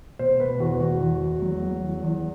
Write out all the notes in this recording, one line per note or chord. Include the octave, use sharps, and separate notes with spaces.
B2 C5
B2 B4
E2 F#4
E2 F#4
E2
E2
F#3
F#3
E2
E2